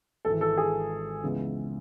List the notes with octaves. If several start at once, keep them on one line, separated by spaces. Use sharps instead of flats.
G#1 G#2 E3 A4
A4
G#4
C#2 C#3 E3 B3